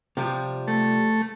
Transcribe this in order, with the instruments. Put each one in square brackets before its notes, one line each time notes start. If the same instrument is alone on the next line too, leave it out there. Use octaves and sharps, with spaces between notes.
[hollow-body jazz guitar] C3 F3 G3
[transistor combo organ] A3